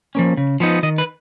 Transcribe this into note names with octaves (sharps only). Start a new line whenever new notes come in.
F3 A#3 C#4
C#3
F3 B3 D#4
D#3 D#5
B4